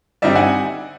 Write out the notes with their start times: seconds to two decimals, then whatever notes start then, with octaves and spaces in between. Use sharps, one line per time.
0.22 G2 D3 G3 C4 D#4 D5 E5
0.35 F#5 G#5